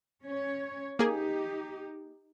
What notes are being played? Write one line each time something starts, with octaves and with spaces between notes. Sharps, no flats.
C#4 C#5
A#3 D#4 G4 G#4